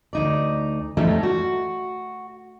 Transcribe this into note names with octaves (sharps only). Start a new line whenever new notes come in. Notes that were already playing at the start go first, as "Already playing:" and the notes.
D2 D#4 D5
F3 G3 A3 C#4 D#4
F#4